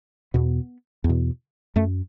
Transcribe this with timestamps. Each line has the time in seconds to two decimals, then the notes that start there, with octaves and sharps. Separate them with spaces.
0.34 E2 B2 B3
1.04 E2
1.09 B2
1.76 F#2 A3